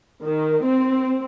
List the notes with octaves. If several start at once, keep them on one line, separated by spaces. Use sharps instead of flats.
D#3
C4